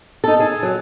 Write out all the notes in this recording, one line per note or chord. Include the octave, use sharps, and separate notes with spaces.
D#4 A4
G#4 A4
F#3